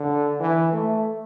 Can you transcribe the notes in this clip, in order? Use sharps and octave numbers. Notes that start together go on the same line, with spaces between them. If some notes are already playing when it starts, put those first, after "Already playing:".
Already playing: D3
E3
A3